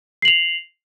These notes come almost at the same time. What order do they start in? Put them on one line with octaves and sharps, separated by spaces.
C7 F#7 F7